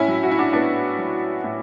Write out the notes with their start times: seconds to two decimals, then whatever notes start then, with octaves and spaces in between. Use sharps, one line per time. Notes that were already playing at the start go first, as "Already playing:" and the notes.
Already playing: A2 C#4 E4
0.08 F#3
0.23 F#4
0.32 E4
0.39 D4 F#4
0.53 A2 B3 D4
0.99 F#3
1.44 A2